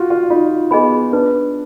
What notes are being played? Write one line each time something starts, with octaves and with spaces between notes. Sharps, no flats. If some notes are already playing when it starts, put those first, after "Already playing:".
Already playing: F4 F#4
F4
D#4 F4
B3 G#4 D#5 G#5 B5
D4 B4